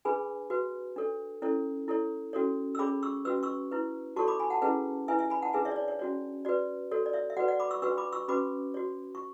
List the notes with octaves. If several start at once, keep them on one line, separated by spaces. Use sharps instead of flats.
D4 G#4 B4 G#5 B5
F#4 B4
D4 A4 C#5
C#4 E4 A4 C#5
E4 A4 C#5
C#4 F#4 A4 C#5
E6
C#4 G#4 C#5 B5 D6
C#6 E6
C#4 F#4 B4 E6
C#6 E6
E4 B4
F#4 A4 C#5 A5 C#6
B5 D6
G#5 B5
F#5 A5
C#4 E4 G#4 B4 F#5 A5
E4 B4 E5 G#5
E5 G#5
G#5 B5
F#5 A5
D4 G#4 B4 E5 G#5
C#5 E5
D5
C#5
C#5
C#4 F#4 C#5
F#4 B4 D5
F#4 A4 C#5
D5
C#5 E5
E5
F#4 B4 D5 F#5
D5 F#5
B5 D6
C#6 E6
D4 F#4 B4 C#6 E6
B5 D6
C#6 E6
C#4 F#4 B4 B5 D6
F#4 C#5
C#6